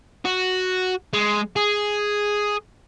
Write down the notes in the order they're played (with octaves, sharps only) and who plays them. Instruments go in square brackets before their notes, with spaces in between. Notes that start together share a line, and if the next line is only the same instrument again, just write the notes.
[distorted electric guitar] F#4
G#3
G#4